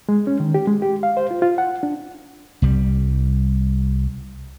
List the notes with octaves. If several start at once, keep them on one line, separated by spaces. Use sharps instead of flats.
G#3
C#4
D#3
G4
G#3
G4
F5
C5
F4
F4
F#5
D4
C2 G3